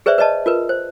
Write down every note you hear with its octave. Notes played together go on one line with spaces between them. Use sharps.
G#4 B4 C5 D5 E5
B4 D5 D#5 A5
F4 A#4 B4
C5